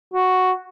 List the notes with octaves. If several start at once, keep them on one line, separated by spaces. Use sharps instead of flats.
F#4